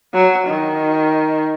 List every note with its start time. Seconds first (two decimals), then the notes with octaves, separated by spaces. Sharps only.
0.14 F#3
0.47 D#3